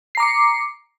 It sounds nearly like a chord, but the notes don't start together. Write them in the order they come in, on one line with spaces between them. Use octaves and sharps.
C7 A#5 D6 C#7